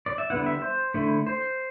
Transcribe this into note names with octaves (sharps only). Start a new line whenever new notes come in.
D5
E5
D3 G3 B3 E4 F#5
E5
C5
D3 A3 E4
C5